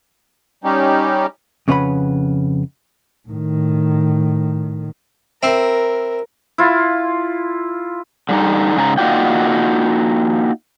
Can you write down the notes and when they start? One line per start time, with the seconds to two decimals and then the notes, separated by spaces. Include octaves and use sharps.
0.64 G3 C#4 D#4 G4
1.68 F2 C#3 C#4 B4 F#5 B5
3.28 A2 D#3
5.43 C4 E4 A#4
6.58 E4 F4
8.29 D3 G3 D#4
8.76 G#2 C#3 G#5 A#5
8.98 A#3 D#4 F4 F#4 D5 G5